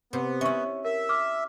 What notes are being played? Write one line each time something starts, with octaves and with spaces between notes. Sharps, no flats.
C3 B3
C#4 E4 E5 C#6
A#4 E5
D6 F6